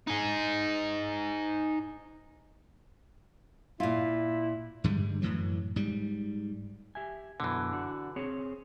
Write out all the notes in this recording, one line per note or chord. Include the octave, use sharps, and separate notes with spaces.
D#4 G#4
A#2 E4 F4
G2 D3 G3 G#3
F#2 A2 E3 F#3
G#2 G3
G4 E5 G#5
F#2 B2 D3 E3
D4 F#4
C4 G#4 C#5